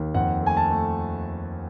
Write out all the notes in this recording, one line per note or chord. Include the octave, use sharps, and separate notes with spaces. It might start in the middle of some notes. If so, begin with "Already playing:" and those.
Already playing: D#2
F2 F#5
A3 G#5
A5
A3